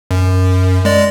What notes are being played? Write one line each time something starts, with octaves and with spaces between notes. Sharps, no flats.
F#2
G#3 D5